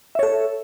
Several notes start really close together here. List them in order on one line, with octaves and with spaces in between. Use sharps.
E5 C#5 A4